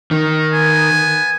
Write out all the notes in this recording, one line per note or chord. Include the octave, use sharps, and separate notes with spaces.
D#3
B3 G#5